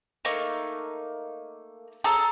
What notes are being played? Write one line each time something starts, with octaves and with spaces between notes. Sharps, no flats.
A3 A#3 D#4
G#4 A4 A#5 E6